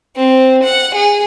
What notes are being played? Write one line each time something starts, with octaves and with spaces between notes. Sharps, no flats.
C4
F#5
G#4